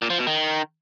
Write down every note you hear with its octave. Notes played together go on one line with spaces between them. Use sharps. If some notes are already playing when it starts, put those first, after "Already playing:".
A#2
F3
B2
D#3